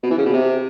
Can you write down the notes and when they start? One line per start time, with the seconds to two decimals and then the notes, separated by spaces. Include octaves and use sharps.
0.03 B2
0.11 E3
0.18 C#3
0.26 B2
0.33 C3